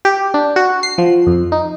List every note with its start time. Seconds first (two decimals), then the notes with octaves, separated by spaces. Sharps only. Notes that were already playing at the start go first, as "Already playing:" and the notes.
0.05 G4
0.34 D4
0.56 F#4
0.83 C7
0.98 F3
1.27 F2
1.52 D#4